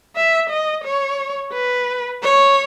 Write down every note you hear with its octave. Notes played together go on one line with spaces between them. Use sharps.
E5
D#5
C#5
B4
C#5